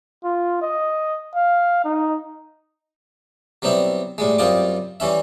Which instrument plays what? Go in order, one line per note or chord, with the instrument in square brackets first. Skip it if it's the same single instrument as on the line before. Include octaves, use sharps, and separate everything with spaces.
[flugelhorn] F4
D#5
F5
D#4
[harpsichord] F#3 G3 B3 C4 E4
A2 G3 G#3
F#2 G3 C4 F4 D#5 D6
E3 G3 C#4 E5